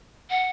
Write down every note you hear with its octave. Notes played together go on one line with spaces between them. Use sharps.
F#5